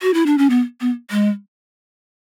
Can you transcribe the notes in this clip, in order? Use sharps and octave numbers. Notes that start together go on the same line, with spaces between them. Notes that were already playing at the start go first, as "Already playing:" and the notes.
F#4
E4
D4
C#4
B3
B3
G#3